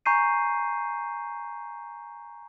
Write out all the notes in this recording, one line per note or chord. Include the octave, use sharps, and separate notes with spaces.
G#5 A#5 C#6 G6 C7 D#7